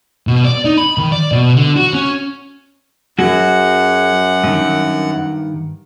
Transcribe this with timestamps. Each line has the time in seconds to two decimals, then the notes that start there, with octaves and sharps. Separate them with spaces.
0.27 B2
0.45 D5
0.65 D#4
0.77 B5
0.98 D#3
1.12 D5
1.32 B2
1.56 D3
1.76 F#4
1.93 C#4
3.18 F#2 F#3 F#4 G#4 F#5
4.44 G2 D#3